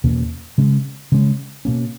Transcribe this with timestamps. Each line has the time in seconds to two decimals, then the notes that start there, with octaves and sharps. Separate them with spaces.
0.04 E2 B2 A#3 C#4
0.58 C#3 G#3 C#4
1.12 C#3 G#3 C#4
1.65 B2 A#3 C#4